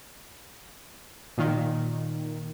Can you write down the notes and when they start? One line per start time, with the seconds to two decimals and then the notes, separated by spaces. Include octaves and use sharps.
1.38 A#2 D#3